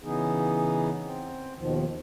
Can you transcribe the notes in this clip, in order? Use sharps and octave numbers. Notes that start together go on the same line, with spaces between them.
C#3 E3 B3 D#4 G#4
C4
D#2 B2 D#3 F3